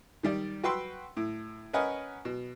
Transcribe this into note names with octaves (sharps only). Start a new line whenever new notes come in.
D#3 G3 D5
F#4 B4 G5 C6 E6
A2
C#4 A#4 B4 D#5 F#5 G#5
B2